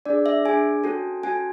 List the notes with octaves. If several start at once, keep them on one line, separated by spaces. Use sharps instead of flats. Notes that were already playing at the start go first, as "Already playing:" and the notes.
D4 G#4 D5
E5
D4 G#4 G#5
C#4 F#4 A4
C#4 F#4 A4 G#5